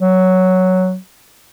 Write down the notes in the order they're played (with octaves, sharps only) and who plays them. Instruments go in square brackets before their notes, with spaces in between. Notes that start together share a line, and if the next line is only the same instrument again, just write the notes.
[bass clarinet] F#3